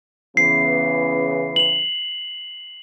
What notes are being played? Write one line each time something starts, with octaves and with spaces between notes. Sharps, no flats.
C#3 E3 B3 C7
F7 F#7